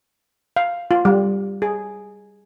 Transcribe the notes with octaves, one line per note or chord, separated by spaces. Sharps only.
F5
F4
G3
G#4